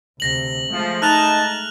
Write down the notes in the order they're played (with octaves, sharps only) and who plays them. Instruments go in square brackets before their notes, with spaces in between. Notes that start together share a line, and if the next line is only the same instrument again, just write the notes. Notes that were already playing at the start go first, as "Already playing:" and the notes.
[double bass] D2 C3 [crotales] A#6 F#7
[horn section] F3 [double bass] G#3 A3
[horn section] D#4 A5 [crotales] F6 F#6 F7